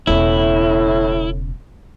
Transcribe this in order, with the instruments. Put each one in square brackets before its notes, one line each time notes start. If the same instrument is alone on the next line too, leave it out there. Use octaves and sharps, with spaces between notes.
[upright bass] E1 C#3 [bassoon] A2 [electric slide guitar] E4